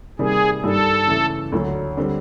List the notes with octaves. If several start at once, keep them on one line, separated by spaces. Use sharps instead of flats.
C3 D#3 G3 A#3 G#4
G2 D#3 G3 A4
C#3 E3 A3
D2 D3 F#3
D3 G3 C4